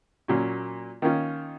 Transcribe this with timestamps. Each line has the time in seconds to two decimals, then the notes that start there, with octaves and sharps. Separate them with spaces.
0.28 A#2 F#3 C#4
1.02 D#3 A#3 C#4 F4